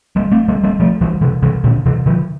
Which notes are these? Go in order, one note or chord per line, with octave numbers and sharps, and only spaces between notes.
G3 A#3
A3 C4
G3 A#3
G3 A#3
F3 A3
E3 G3
C3 E3
C3 E3
A#2 D3
C3 E3
D3 F3